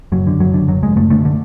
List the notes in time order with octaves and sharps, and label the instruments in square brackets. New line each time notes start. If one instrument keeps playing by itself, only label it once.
[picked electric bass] F#1 F#3
D3
F#1 F#3
D3
F#1 F#3
F#1 G#3
F#1 A3
D3 A3
D3